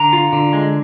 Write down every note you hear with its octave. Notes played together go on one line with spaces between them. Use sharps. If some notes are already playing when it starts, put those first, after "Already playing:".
Already playing: D3 A#5
F4
D3
G#3